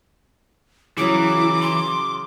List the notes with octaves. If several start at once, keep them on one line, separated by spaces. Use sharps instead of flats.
C#3 E3 F#3 E4 D6
C6